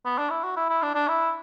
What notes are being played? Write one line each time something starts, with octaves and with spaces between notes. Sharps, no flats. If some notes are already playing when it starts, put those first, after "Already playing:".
B3
D4
E4
F#4
E4
E4
D4
D4
E4